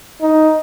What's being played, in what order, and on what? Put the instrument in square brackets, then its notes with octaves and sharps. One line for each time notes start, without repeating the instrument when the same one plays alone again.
[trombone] D#4